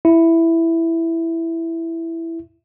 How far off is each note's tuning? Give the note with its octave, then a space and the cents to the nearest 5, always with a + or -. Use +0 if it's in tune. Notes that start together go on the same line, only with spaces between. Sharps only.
E4 +5